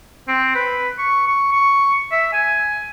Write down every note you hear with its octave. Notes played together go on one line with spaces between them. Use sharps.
C4
B4
C#6
C#6
C#6
E5
G#5